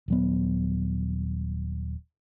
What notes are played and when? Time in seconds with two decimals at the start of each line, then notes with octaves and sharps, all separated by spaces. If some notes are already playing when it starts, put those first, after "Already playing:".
0.08 D#1 F#3 B3